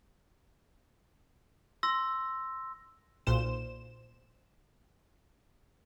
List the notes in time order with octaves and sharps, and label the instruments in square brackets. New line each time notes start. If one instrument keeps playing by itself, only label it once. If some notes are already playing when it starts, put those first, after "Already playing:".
[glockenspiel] C6 E6 A#6
[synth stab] B1 A#2 C5 E7